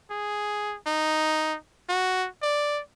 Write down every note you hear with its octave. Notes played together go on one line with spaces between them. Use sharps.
G#4
D#4
F#4
D5